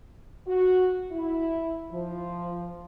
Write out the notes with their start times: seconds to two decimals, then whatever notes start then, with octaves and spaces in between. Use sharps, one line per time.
0.47 F#4
1.11 E4
1.92 F3